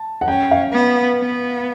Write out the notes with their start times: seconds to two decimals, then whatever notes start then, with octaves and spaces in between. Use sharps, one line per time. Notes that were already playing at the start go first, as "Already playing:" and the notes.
Already playing: A5
0.21 F#5
0.28 C#4 G5
0.51 F5
0.73 B3
1.19 B3